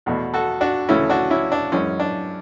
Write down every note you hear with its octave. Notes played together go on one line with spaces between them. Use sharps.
E2 B2 A3
F#4 A4
D4 F#4
D2 C#3 E3 A3 C#4 E4
D4 F#4
C#4 E4
D4
F#2 E3 G#3 C#4
D4